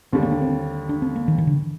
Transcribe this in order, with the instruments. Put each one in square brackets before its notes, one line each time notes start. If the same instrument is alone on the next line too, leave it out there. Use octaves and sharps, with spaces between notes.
[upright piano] D#2 D3 G3 [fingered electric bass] C4
[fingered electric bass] A#3
D4
C4
D4
C4
A#3
D#3
D#3
D3